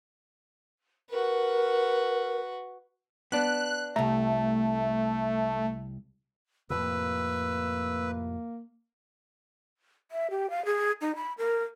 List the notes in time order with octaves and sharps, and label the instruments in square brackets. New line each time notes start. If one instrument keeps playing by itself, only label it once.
[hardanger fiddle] F#4 B4 [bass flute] A#4
[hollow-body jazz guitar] B3 D4 [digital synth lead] F#6
[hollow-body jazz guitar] C2 A#5 [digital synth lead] A3
[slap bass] F2 A2 C3 [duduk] A#3 [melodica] B4 [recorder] E6
[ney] E5
G4
F5
G#4
D#4
B5
A#4